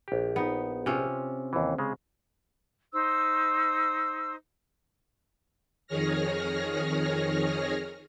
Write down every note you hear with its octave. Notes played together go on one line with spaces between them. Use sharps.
A#1 G4
B3 D#4
C3 C#4 F4
D#2 E3
C#3 G#3
D#4 C5 E6
F2 D#3 G#4 C#5 F6 A#6